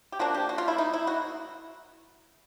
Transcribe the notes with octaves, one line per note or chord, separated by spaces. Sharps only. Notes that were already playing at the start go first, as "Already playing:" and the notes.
G4
F3 A#3 D4 F#4
G4
F#4
F4
E4
D#4
E4
F#4